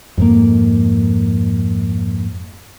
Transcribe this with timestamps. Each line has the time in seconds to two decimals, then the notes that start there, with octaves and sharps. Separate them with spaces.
0.18 F2 G#2 A#3